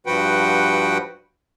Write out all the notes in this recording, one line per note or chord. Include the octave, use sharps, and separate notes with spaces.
G2 F3 F#4 B4 F#5 G5